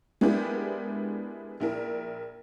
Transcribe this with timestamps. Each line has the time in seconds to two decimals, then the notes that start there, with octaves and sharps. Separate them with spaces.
0.21 G#3 B3 D4 E4 G4 A#4
1.60 A#1 E4 A#4